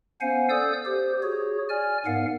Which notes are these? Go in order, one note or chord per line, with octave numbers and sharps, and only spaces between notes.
B3 C#4 C5 F5 F#5 G#5
A4 D5 D#6 E6 G6
G4 C5
F#4 G#4 C#5
D5 G#5 F6
G#2 B3 A#4 F5 F#5